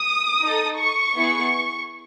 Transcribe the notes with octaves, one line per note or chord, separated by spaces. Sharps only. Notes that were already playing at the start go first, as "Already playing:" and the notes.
Already playing: D#6
D#4 A4
C#6
B3 E4 G#4